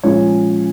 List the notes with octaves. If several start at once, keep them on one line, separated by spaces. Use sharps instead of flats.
A#2 F3 G#3 C#4 C#5